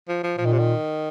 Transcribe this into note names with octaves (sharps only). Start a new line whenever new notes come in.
F3
F3
A#2 F3
D#3
C3
D#3